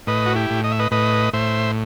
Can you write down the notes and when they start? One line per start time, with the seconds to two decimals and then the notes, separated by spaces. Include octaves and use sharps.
0.07 A2 B4 D#5
0.26 F#4
0.35 E4 G4
0.50 A2
0.64 D#5
0.72 E5
0.80 B4 D#5
0.91 A2 B4 D#5
1.33 A2 C5 E5